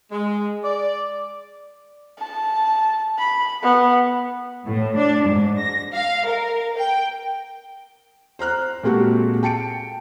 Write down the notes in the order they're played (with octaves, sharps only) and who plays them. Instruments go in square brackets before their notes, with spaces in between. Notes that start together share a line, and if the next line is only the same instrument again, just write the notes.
[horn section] G#3
D5
[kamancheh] A5
B5
B3
[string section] A2
D4
G#2
A#6
F5
A#4
G5
[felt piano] C5 A#5 F6 F#6
A#2 G#3 C4 F#4 G4 A4
G5 A5 C#7 D7